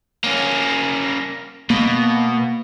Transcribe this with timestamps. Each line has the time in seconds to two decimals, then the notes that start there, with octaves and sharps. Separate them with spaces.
0.24 A#3 C#4
1.70 B2 A#3